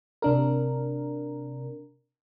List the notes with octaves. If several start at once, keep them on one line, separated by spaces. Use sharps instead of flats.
C3 D4 A#4